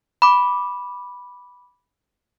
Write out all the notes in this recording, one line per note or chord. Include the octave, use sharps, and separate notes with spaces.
B5 D6